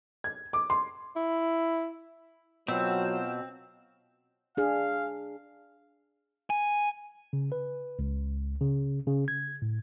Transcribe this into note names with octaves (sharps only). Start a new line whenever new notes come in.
G#6
D6
C6
E4
B2 F#3 C4 F4 G5 E6
D4 G#4 F5
G#5
C#3
B4
C#2
C#3
C#3
G#6
A2